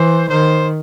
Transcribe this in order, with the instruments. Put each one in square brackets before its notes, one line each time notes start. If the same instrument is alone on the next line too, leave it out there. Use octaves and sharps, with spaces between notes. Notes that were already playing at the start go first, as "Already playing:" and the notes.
Already playing: [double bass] E3 [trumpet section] C5
[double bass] D#3 [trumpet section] C5